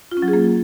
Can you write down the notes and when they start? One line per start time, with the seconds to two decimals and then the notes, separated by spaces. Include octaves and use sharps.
0.11 F4
0.17 C#4
0.22 F#3
0.28 G#4
0.33 A#3